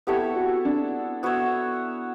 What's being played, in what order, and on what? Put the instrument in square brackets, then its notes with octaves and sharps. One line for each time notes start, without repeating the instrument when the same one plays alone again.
[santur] B3 E4 A4 C#5 [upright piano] G4
[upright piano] F#4
D4
[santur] B3 F#4 C#5 E5